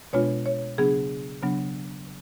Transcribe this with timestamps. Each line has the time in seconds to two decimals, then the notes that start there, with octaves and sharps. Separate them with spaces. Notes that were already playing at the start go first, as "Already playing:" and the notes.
0.13 B2 G#3 B3 D4 F4 C#5
0.46 C#5
0.78 C#3 F#3 B3 D4 G#4
1.42 C#3 F#3 B3 D4